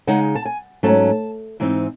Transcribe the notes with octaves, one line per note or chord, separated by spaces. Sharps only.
C#3 G#3 D#4 F#5
A5
G#5
G#2 F#3 A3 C#4 A5
G#2 E3 C4 D#4